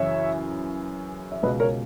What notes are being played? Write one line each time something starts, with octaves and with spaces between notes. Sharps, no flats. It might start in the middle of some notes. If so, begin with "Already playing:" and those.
Already playing: F#2 C#3 E3 C#5 E5
E5
C#2 B2 B4 D#5
A#4 C#5